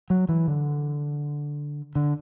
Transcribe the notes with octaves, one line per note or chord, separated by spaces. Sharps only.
F#3
E3
D3
D3